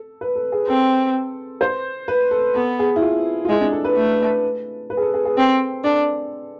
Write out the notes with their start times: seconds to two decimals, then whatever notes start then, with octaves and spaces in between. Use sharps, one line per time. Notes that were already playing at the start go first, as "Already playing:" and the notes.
Already playing: A4
0.21 B4
0.36 A4
0.52 G#4
0.67 C4 A4
1.61 C5
2.08 B4
2.31 A4
2.55 B3 A4
2.79 G#4
2.96 E4
3.02 F4
3.45 F4
3.49 G#3 E4
3.61 D4
3.72 A4
3.85 B4
3.96 A3
4.90 B4
4.97 G#4
5.02 A4
5.14 G#4
5.25 G#4
5.37 C4 A4
5.84 D4 A4